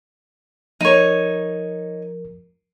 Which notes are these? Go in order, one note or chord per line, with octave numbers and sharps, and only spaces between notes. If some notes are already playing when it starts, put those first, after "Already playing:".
F3 D#4 A#4 C#5